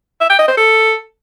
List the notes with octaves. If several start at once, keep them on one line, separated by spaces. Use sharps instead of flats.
E5
G5
D#5
C5
A4